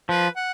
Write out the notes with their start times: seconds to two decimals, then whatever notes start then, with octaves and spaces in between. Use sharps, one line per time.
0.09 F3 B4
0.36 F#5